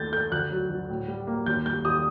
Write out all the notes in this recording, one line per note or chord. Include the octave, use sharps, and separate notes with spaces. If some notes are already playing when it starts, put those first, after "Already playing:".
Already playing: D#2 A3 G6 A6
A3 G6
D2 F#6
F#3
D2
A2
G3
A#3
D#2 G6
G3 G6
D#2 D#6